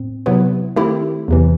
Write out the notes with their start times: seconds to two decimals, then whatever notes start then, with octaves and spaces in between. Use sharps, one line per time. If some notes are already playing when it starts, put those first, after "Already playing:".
Already playing: A2 C4
0.26 C3 F#3 B3 E4 B4
0.76 D#3 A3 C4 E4 G4
1.28 E2 C3 E3